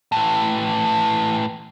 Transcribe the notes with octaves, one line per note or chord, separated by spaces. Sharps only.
A2 E3